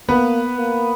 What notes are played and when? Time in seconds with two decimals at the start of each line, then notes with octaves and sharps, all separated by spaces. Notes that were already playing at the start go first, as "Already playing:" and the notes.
0.09 A#3 B3 B4
0.58 A#3